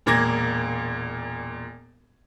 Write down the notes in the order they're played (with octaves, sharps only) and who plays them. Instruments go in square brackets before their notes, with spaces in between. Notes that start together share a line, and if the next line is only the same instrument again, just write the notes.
[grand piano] E1 A#2 A#3 D6 G#6 A#6